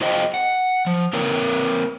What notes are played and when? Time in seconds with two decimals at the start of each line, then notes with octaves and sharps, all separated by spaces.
0.01 F4 G#4 C5 D#5 F5 G5
0.34 F#5
0.87 F3
1.13 A#3 C4 A#4 C#5